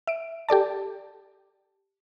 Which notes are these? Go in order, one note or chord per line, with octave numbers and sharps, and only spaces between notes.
E5 D7
G4 A4 D5 A5